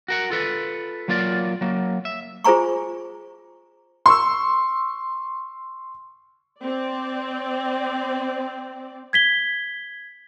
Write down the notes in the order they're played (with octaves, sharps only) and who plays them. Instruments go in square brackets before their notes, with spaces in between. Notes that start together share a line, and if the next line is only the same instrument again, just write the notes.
[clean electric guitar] F#4 A#4 F#5
F4 A4 B4
F#3 A#3 F4 A#4 D5
F#3 A#3
E5
[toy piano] F4 G#4 C5 G#5 A#5 C#6
[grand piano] C6 C#6 E6
[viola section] C4 D5
[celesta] G#6 B6 G7